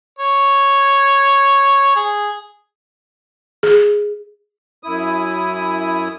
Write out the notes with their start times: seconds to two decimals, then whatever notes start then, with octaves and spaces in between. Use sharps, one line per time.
0.19 C#5
1.96 G#4
3.63 G#4
4.83 F#2 E4 D#6